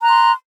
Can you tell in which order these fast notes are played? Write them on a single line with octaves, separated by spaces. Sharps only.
A#5 F#6 C6